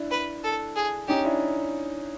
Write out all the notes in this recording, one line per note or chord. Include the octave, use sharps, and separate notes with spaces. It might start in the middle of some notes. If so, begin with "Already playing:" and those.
Already playing: D4 E4
B4
A4
G#4
C#4 D#4 G4
D4 E4